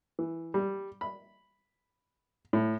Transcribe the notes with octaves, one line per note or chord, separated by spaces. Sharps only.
E3
G3
B5
A2